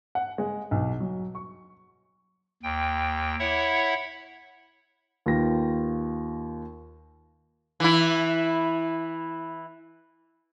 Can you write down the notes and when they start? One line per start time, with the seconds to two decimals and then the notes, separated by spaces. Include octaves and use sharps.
0.15 F#5
0.38 G#3
0.71 B1
1.00 F#3
1.35 C#6
2.63 D#2 G5
3.39 E4 C#5 E5 F#5
5.26 D#2 F4 B4 G5 A#6
7.80 E3 E4